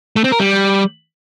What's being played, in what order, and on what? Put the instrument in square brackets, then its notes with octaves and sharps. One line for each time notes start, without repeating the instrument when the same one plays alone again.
[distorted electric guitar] A3
C4
A#4
G3